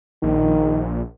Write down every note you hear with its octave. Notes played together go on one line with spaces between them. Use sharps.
A#1 D#3